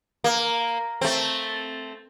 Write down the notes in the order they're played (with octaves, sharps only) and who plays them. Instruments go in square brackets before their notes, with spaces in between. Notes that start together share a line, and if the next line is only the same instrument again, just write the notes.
[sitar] A#3
A3 C4